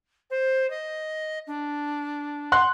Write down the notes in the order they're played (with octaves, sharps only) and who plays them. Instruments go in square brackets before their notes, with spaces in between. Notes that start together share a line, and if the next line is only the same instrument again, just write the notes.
[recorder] C5
D#5
D4
[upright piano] F#5 C6 F#6